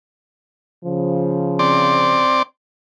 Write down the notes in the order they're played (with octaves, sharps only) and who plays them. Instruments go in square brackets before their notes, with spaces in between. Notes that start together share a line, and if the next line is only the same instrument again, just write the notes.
[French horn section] C#3 F3
[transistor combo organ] C4 D5